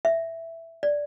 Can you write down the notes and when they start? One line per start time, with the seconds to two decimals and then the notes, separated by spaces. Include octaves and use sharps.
0.05 E5
0.83 D5